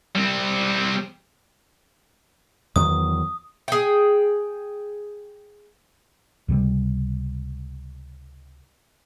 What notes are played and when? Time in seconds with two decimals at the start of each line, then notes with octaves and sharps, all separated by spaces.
0.16 G3 C4
2.76 E2 D#3 F#3 D#6
3.68 G#4 G5
6.48 C#2 C3 F3 G3